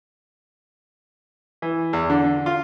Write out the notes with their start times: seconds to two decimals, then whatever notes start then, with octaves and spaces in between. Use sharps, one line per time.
1.62 E3
1.93 E2
2.10 D3
2.24 D3
2.46 F4